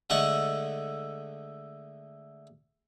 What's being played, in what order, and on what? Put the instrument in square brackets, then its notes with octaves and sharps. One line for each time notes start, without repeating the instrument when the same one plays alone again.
[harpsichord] D3 G#3 A3 F#5 C#6